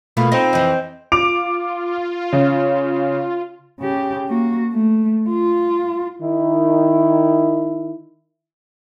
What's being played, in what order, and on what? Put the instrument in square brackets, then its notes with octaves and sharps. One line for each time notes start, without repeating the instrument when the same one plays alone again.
[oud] B2 A3 A#3 [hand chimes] F4 F5 B5
[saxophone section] C4 [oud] D#4 [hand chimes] A#6
[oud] F2 E3 [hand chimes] C5 D#5 G6
[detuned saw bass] F4 [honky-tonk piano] D6 D7 F7
[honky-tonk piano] C#3
[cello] C#3 G4
A#3 F#4
A3
F4
[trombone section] D#3 E4